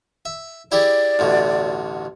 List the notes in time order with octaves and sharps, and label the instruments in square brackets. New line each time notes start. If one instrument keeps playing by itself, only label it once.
[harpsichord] E5
[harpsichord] E4 G4 G#4 [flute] D5
[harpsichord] A1 D2 B2